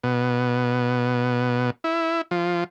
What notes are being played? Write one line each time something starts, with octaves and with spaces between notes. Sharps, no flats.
B2
E4
F3